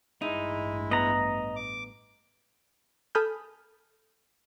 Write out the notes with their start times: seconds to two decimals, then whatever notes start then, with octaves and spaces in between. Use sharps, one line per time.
0.22 A1 G2 G#3 D#4 E4
0.91 B3 D#5 A#5
1.56 D6
3.15 A4 G#5 B5 D#6 F6 G6